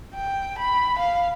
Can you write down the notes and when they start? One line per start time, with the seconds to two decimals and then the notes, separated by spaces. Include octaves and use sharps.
0.15 G5
0.58 B5
0.99 F5